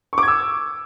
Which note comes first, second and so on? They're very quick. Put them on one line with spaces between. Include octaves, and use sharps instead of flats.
C#6 D6 G#6 E6